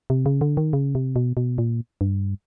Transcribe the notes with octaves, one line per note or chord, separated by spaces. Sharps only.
C3
C#3
D3
D#3
C#3
C3
B2
B2
A#2
G2